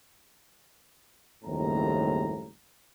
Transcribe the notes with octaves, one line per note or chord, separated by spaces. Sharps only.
F#1 D#2 A2 G3 C4 A#5